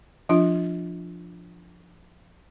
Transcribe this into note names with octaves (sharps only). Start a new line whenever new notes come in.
F3 D4 F4